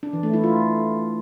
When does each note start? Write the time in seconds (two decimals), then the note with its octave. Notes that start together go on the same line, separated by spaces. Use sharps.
0.03 D4
0.13 E3
0.23 A3
0.33 E4
0.44 F4